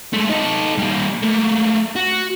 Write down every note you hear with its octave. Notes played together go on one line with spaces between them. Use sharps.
G#3 A3
D#4 A4
G3 A#3
A3 A#3
F#4